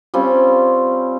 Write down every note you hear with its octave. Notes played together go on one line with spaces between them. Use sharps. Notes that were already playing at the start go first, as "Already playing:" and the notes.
G3 C4 C#4 F4